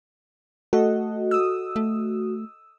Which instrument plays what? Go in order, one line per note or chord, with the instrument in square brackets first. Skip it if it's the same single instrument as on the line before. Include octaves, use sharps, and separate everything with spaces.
[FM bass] A3 [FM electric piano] F#4 [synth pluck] A4 D#5
[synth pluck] D#6 E6
[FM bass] A3